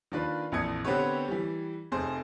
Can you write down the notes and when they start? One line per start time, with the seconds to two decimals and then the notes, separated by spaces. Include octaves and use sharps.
0.12 D#3 A#3 D4 F4 B4
0.52 A#1 F2 E3 D#6 G#6 C#7
0.85 D3 B3 C4 G4 B4 C#5
1.28 E3 G3
1.92 F1 F2 G#4 C5